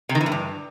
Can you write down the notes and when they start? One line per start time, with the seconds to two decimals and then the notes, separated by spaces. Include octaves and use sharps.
0.09 C3
0.15 D#3
0.21 E3
0.26 A2
0.32 G2